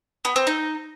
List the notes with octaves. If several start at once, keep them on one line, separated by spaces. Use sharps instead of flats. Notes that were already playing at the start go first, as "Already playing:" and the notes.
B3
C4
D#4